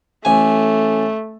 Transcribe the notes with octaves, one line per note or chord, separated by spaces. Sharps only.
A1 A3 G#5